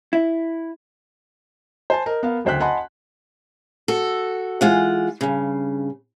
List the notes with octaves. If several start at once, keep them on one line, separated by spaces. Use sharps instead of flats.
E4
C5 G#5 A5
A#4 D#5
B3 A#4 F5
F#1 D2 C5 G5 F#6 B6
D#5 F#5 G#5 A5 B5 C6
F#4 A4
E3 G#3 F4 F#5
G2 C#3